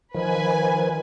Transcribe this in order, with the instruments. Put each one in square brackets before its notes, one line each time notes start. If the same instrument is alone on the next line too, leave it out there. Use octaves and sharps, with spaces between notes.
[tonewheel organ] D#3 F3 [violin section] B4 G#5